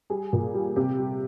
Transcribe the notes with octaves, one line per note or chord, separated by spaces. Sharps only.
G3 G#4
A#2
G3
C3 G4
G3